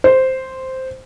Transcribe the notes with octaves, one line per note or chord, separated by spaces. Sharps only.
C5